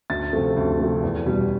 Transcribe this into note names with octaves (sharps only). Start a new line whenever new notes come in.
D2 A6
C3 F3 A3
D2
C3 F3 A3
E2
B2 G3